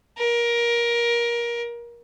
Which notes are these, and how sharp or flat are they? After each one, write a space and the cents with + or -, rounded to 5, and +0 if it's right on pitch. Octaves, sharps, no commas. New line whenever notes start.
A#4 +20